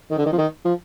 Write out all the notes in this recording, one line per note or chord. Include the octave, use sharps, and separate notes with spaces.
D#3
D3
D#3
F3
D#3
F3